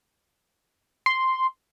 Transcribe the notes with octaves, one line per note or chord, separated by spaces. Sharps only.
C6